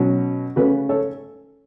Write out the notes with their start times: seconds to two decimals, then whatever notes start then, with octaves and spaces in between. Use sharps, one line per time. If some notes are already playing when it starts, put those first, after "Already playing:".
Already playing: B2 F#3 C#4
0.56 C#3 A3 C#4 F#4 B4
0.89 A4 C#5